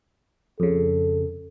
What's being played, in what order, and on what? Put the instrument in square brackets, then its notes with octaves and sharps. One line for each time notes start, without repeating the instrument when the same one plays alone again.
[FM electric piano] F2 C#3 [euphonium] A4